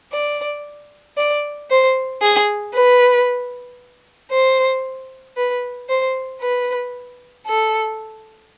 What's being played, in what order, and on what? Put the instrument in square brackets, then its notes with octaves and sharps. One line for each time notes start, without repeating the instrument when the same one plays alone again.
[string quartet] D5
D5
C5
G#4
B4
C5
B4
C5
B4
A4